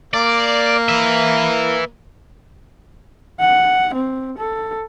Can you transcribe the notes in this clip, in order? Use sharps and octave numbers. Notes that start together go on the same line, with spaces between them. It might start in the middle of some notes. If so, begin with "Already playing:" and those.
A#3 D5
B4 E5
F#5
C4
A4